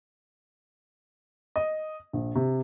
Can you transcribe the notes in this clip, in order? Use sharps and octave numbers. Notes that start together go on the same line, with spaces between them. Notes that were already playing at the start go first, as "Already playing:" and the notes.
D#5
A#1
C3